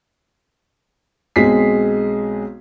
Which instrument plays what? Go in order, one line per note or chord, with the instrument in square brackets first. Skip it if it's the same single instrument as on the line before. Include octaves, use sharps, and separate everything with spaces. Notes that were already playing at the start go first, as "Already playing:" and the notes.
[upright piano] B1 G#3 C4 G#4 B6 C7